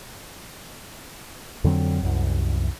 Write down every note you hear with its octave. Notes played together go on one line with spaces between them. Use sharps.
F2 D3 F#3 C4
C2 F#2